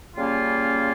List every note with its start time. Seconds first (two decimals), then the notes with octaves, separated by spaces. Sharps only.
0.17 C#3 G3 A#3 C#4 F4